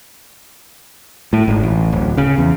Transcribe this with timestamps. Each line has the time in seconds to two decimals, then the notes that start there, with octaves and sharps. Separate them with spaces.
1.33 A2
1.48 G#1
1.63 A1
1.92 D1
2.17 C#3
2.38 E2